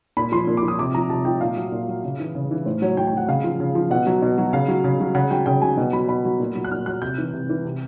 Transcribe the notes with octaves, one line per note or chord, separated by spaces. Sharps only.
A#2 B5
F3 C6
A#2
D6
F3
D#6
C3 D6
F3 A#5
C3 A5
F3 G5
A#2 F5
F#3
A#2
F#3
C#3
E3
C#3
E3
A2 C5
F#3 C#5
A2 G5
G5
F#3 F#5
C#3 F5
F3
C#3
F3
B2 F#5
F#3
B2
F#3
C#3 F5
F#3
C#3
F#3
C#3 F#5
F#3 G5
C#3 G5
F#3 G#5
B2
F#3 B5
B2 B5
F#3
A#2
F#3
F#6
A#2 F6
F#3 F#6
C3 G6
E3
C3
E3
C3